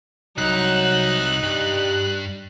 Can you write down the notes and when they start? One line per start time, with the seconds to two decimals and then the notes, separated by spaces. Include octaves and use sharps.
0.38 C2 F#3 D#4 E4 F#6
1.43 G2 G3